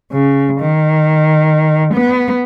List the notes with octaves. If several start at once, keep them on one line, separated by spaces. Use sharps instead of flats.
C#3
D#3
B3